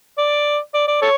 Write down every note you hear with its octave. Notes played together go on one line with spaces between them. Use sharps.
D5
D5
D5
A4 C#5